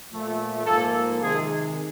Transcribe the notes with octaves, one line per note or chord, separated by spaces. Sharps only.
A#2 F3 A3
G#2 F3 A#3 A4
C3 D#3 G#3 G#4